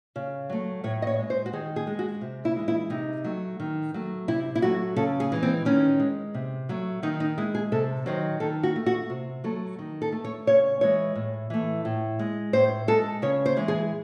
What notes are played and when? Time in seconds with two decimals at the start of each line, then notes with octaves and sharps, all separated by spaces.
0.16 C#3
0.50 F#3 A3
0.84 A2 C#5
1.02 D#5
1.07 C#5
1.19 G#3
1.30 C5
1.46 F#4
1.53 D#3 G#4
1.76 G#4
1.87 G#3
1.99 F#4
2.21 C3
2.45 E4
2.56 E3 G#3
2.68 E4
2.90 C3 D#4
3.24 F#3 A3
3.60 D#3
3.94 F#3 A3
4.28 C3 E4
4.55 E4
4.62 F#3 A3 F#4
4.96 C#3 A4
5.20 G#4
5.32 E3 G#3
5.43 C4
5.65 D#3 C#4
6.00 G#3
6.34 C3
6.69 F#3 A3
7.03 D#3 D#4
7.20 D#4
7.38 G#3 E4
7.55 G#4
7.72 C3 A4
8.06 D#3 F#3 C5
8.40 D#3 A4
8.63 F#4
8.76 A3
8.86 F#4
9.10 C3
9.44 F#3 A3 A4
9.79 D#3
10.02 A4
10.12 A3
10.25 C#5
10.47 C#3 C#5
10.81 E3 G#3 C#5
11.15 A2
11.50 E3 A3
11.85 A2
12.19 G#3
12.53 A2 C5
12.88 G#3 A4
13.22 C#3 C#5
13.46 C5
13.57 E3 G#3
13.68 G#4